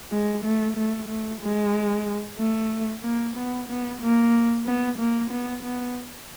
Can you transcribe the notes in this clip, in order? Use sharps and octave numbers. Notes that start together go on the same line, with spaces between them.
G#3
A3
A3
A3
G#3
A3
A#3
B3
B3
A#3
B3
A#3
B3
B3